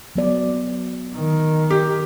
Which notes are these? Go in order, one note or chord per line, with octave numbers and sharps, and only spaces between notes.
F#3 B3 D5
D#3
G4